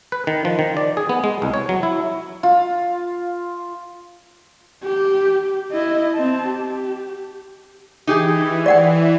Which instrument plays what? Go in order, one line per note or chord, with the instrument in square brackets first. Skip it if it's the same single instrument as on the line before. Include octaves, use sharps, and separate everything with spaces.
[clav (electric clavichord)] B4
D#3
F3
D#3
D5
G#4
B3
G#3
C2
C#5
F#3
E4
[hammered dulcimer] F4
[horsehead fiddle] G4
E4 D#5
C4 A5
G4
[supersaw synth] E3 [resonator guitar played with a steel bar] D#4 G4 G#4
[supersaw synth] E3 [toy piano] D5 F#5 G5